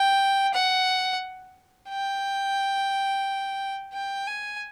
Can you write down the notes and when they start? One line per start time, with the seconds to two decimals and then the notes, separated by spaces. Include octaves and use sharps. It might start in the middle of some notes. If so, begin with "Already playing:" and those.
Already playing: G5
0.53 F#5
1.89 G5
3.94 G5
4.27 G#5